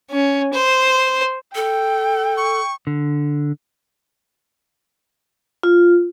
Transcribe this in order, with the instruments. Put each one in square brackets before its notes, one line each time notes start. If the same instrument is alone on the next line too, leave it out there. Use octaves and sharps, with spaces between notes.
[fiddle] C#4
C5
[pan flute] A4 [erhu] G5
[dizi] C#6
[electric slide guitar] D3
[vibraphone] F4